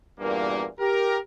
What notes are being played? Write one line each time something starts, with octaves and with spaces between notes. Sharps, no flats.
E2 G2 A#2 A#3
G4 A#4